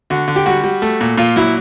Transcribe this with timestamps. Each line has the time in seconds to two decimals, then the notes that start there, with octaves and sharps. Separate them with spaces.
0.10 D3 F#4
0.28 D3
0.36 G4
0.46 G3 F#4
0.64 G3
0.82 A3
1.01 A#2
1.18 A#2 F4
1.36 F#3 E4